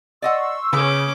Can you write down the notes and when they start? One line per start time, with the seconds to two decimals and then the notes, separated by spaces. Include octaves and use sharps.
0.22 D5 D#5 F#5 C6 C#6 E6
0.73 C#3 C#4 B4 D6